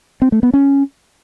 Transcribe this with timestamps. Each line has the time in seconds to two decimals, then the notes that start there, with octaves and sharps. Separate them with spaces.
0.22 C4
0.32 A3
0.43 B3
0.54 C#4